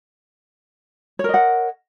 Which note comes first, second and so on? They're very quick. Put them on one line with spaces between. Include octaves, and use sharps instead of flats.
C#5 A#4 D#5 F#5